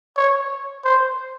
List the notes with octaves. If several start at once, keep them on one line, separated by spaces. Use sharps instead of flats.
C#5
C5